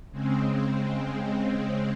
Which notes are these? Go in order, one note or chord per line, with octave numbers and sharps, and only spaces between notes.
C#3 G#3 C4